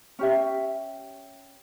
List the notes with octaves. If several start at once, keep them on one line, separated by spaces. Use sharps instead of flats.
C#4 G4 E5